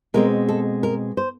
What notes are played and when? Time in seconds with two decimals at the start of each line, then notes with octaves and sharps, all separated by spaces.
0.14 B2 G#3 C4 A#4
0.49 A4
0.83 A#4
1.17 C5